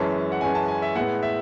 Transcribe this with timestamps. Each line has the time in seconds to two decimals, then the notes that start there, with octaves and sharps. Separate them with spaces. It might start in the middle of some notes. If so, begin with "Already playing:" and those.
Already playing: F#2 E3 G#3 C#4 A5
0.32 F#5
0.41 F#2 E3 G#3 C#4 G#5
0.55 A5
0.68 G#5
0.82 E5
0.95 A2 G#3 B3 F#5
1.23 E5